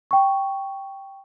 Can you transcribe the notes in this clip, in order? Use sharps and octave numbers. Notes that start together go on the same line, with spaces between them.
G5 C#6